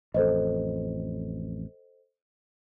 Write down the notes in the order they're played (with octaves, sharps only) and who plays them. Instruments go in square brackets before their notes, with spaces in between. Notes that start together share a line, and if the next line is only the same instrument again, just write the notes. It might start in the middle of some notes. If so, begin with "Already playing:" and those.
[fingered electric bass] A1 F2 [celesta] A4 C5 D#5